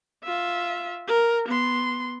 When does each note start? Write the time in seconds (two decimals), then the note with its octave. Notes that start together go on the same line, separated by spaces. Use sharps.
0.24 F4 E5
1.08 A#4
1.48 B3 C6